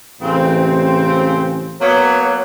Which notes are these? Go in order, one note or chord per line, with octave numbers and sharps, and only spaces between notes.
A1 C#3 C4
F#3 A#3 B3 C#5